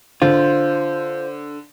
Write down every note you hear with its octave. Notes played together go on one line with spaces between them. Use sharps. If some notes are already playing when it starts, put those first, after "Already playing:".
D3 F4 C5